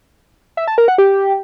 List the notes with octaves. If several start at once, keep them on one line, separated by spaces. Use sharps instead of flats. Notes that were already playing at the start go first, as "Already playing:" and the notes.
E5
A5
A#4
F#5
G4